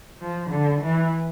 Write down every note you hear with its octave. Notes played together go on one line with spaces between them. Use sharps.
F3
D3
E3